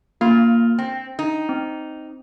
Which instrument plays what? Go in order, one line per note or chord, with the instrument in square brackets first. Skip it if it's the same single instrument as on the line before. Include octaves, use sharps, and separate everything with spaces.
[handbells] A#3 [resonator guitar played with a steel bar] F4
[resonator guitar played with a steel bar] C4 [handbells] G5
[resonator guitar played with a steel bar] D#4
[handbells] C4